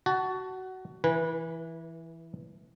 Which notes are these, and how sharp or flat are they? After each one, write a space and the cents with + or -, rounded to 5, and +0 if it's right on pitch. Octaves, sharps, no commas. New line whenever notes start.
F#4 +20 A5 +0
E3 +0 B4 -25 G#5 -15